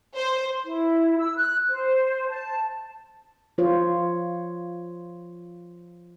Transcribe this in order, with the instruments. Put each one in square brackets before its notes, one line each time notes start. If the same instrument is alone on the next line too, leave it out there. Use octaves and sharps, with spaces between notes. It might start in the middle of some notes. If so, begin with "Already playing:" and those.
[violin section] C5
[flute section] E4
E6
F#6
C5
A5
[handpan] F3 F4 C5 C#5